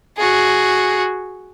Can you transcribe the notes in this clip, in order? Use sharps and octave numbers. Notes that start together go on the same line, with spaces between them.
F#4 G#4